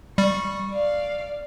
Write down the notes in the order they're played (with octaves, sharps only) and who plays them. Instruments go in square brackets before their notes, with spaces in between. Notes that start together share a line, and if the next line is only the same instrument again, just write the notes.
[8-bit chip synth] G3 [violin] C#6
[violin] D5 F5